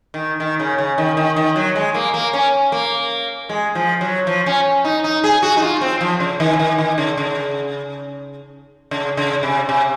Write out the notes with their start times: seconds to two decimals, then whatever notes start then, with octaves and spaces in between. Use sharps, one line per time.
0.14 D#3
0.40 D#3
0.60 C#3
0.78 C#3
0.98 D#3
1.17 D#3
1.36 D#3
1.56 F#3
1.76 G#3
1.94 A#3
2.14 A#3
2.33 C#4
2.72 A#3
3.49 G#3
3.75 F3
4.01 F#3
4.27 F3
4.46 C#4
4.85 D#4
5.04 D#4
5.24 G#4
5.43 F#4
5.57 D#4
5.62 F4
5.81 C4
6.01 F3
6.20 C#3
6.40 D#3
6.59 D#3
6.78 D#3
6.98 C#3
7.17 C#3
8.91 C#3
9.17 C#3
9.43 C3
9.69 C3